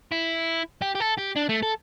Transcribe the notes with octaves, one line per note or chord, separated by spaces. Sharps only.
E4
G4
G4
A4
G4
D4
A3
A4